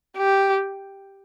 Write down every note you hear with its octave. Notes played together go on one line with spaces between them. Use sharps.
G4